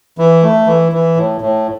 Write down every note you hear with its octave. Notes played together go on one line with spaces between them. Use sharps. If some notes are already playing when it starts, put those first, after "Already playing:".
E3
A3
E3
E3
A2
A2